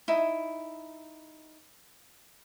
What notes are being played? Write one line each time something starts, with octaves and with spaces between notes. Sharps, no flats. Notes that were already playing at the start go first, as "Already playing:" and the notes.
D#4 E4